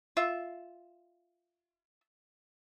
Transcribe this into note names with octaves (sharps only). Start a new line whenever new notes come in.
F4 E5